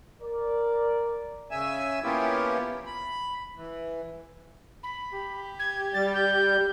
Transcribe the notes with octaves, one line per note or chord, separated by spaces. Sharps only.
A#4 D5
C#3 E5 G#5 E6
A#3 B3 C#4 E4 F4 G4
B5
E3
B5
G4
G#6
G3 A6
G6